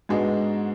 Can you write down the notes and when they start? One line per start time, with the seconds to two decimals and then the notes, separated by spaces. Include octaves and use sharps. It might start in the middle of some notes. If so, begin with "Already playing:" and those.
0.09 G#2 G#3 B3 D4 F#4